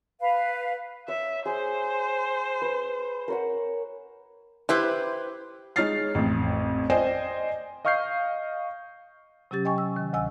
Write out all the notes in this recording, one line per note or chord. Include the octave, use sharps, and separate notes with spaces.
B4 F5
C#5 E5
G#4 C5
B4
A#4 C#5 F#5
E4 G4 B4 C5
G#3 D#4 C#5 F6 A6 C7
A1 F2
C5 D5 D#5 G5 G#5
D#5 F5 C#6 F6 G6 C7
C3 F#3 C#4 G4 A6
D#5 G5 G#5 C#6
E6
D#3
D2 C3 D#5 G#5 E6